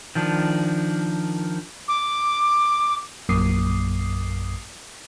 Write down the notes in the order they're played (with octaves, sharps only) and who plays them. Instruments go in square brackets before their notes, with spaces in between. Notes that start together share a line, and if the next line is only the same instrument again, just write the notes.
[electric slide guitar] D#3 F3 D4
[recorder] D6
[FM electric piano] A#1 F#2 A#3 D6 D#6 C7